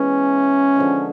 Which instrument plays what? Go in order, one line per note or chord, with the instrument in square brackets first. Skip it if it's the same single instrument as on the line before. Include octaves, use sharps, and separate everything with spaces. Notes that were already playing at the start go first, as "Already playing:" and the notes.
Already playing: [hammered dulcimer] E3 G#3 B3 [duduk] C#4
[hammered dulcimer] D3 F3 G#3